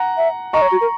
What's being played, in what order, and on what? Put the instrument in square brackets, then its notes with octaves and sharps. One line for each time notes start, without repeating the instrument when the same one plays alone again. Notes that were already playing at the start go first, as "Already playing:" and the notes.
Already playing: [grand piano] F#5 A#5
[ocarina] E5
[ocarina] D#5 [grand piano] A#5 C#6
[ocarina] C#5
F#4
A#4